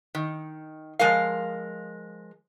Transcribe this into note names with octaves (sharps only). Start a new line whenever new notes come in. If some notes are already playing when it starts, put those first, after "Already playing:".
D#3
F3 G#3 A#4 F5